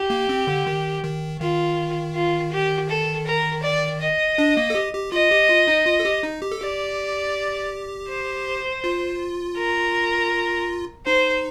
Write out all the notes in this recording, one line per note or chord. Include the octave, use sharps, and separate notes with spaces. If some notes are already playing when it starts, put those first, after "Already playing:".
Already playing: G4
A#3
C4
D3
D#3
D#3
D#3 F4
F4
G4
A4
A#4
D5
D#5
D4
A#3
A4
G4
G4
F4 D#5
G4
F4
D#4
F4
A4
G4
D#4
G4
A4
G4 D5
C5
F4
A#4
D#4 C5